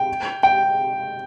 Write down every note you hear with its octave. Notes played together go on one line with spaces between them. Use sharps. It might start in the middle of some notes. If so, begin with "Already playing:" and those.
Already playing: G5
G5